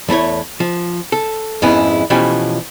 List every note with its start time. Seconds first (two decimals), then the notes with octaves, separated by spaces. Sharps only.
0.09 E2 A3 E4 C#5
0.60 F3
1.12 A4
1.62 F2 G#2 B3 C#4 E4 G#4
2.10 B2 E3 F3 A3 C#4 G4